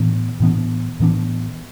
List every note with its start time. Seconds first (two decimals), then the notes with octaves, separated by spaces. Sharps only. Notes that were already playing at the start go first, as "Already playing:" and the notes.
Already playing: A2 E3 B3 D4
0.40 A2 E3 B3 D4
1.00 A2 E3 B3 D4